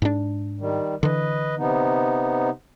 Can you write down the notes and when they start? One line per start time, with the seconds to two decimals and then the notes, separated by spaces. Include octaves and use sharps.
0.02 G#2 D4
0.60 D#3 G3
1.03 D3 E3 B4 D#5
1.58 C3 B3 D#4